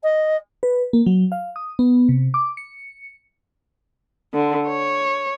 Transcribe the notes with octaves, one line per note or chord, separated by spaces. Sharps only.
D#5
B4
A#3
F#3
F5
D#6
B3
C3
D6
C#7
D3
C#5